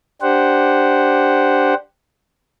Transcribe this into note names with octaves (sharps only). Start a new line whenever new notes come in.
D4 G4 C5 F#5